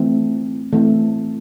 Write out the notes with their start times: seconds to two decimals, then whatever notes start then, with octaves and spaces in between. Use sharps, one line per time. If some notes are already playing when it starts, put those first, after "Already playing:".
Already playing: E3 A3 C4
0.72 E3 A3 C4